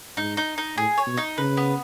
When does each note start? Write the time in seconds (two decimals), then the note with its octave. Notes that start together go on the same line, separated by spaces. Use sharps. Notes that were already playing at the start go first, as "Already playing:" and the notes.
0.17 G#2 D#4
0.37 D#4
0.58 D#4
0.77 A2 G#4
0.98 C#5
1.07 B2
1.17 D#4
1.38 C#3 B4
1.57 B3